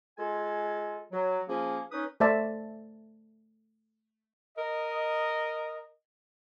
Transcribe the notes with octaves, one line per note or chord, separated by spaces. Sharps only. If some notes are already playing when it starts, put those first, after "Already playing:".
G#3 F4 A4 G#5
F#3
F3 A#3 C#4 G#4
C#4 D#4 B4 D#6
A3 C5 D5 E5 A5
A#4 D#5